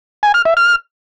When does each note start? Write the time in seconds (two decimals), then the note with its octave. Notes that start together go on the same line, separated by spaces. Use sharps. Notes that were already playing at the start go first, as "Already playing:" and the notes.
0.23 G#5
0.34 F6
0.45 E5
0.57 F6